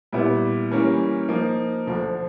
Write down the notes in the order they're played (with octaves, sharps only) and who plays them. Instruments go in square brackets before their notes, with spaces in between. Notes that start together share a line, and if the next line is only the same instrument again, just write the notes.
[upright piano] A#2 G3 B3 E4
E3 G3 A#3 C#4
F3 A#3 D#4
D2 D3 F3